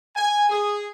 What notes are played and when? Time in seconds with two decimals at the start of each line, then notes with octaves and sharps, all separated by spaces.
0.16 G#5
0.50 G#4